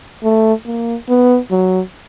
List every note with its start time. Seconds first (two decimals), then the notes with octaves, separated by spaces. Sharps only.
0.23 A3
0.66 A#3
1.08 B3
1.51 F#3